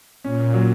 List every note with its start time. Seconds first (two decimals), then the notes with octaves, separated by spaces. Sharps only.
0.24 A#2 C#4
0.54 F#3